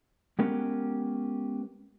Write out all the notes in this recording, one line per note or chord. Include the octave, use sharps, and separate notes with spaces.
G#3 B3 C#4 G4 A#4 B4